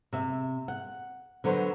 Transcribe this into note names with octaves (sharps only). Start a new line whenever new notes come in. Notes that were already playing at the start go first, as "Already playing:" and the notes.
C3 E5
F#5
D3 F#3 B4 C5